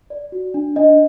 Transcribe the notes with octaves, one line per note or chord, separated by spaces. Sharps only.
D5
F#4
D4
D4 D#5